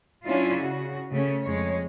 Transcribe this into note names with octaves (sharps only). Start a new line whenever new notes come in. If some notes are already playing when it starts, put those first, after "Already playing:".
F#3 C#4 D4 E4 F4
C#3 F#4
C#3 A3 C#4
F2 G#3 C#5